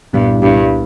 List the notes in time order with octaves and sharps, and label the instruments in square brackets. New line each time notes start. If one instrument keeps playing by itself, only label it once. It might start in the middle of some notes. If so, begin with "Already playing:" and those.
[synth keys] C2 A#2 G3 B3 E4 [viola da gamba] G2
[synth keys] C2 A#2 G3 B3 E4 [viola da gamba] G2